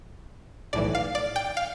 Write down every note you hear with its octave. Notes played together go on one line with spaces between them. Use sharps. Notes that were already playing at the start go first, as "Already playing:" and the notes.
B1 A2 E3 D5
F5
D5
G5
F5